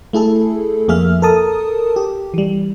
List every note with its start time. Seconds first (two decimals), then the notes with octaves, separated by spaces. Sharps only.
0.13 A3 E4 G#4 A4
0.88 F2 A#3 G#4 E5 F6
1.22 A4 A#4 A5 D#6
1.96 G4
2.34 E3 G3